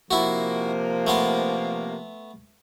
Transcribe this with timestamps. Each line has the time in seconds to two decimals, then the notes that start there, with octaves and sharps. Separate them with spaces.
0.11 C3 F3 A#3 E4 F#4
1.07 A3 B3 C6